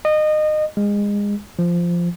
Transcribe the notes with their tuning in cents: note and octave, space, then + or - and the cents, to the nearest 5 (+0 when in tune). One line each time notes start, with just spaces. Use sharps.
D#5 -25
G#3 -25
F3 -10